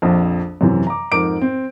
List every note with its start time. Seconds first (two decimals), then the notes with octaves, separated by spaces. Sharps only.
0.02 A#1 F2
0.61 F#2 C3 E3
0.87 A#5 D6
1.12 F2 G#2 A#4 D6 D7
1.41 C4